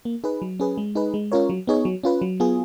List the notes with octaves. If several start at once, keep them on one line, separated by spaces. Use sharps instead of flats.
A#3
D#4 G#4 B4
F#3
C#4 G#4 B4
G#3
D#4 G#4 B4
G#3
C#4 F4 A#4 C#5
F#3
B3 D#4 G#4 C#5
F#3
C#4 F4 B4
F#3
B3 F4 G#4